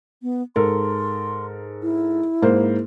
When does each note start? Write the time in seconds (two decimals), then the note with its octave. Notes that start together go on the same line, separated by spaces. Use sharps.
0.22 B3
0.56 G#2 A4 A#4 C6
1.83 E4
2.42 G#2 A#3 C5